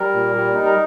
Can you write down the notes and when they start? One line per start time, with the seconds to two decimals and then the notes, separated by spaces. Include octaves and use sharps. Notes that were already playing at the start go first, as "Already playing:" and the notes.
Already playing: G3 A#4
0.14 A#2
0.34 G3
0.54 D#4
0.65 A#4